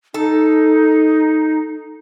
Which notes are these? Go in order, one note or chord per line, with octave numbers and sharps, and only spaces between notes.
D#4 A4